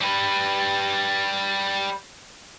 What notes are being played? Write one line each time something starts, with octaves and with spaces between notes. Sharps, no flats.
G3 B4